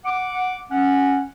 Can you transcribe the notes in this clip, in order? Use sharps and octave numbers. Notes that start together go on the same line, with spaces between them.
F#5 D6
C#4 F#5